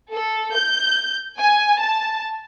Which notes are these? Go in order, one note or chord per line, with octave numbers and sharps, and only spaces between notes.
A4
G6
G#5
A5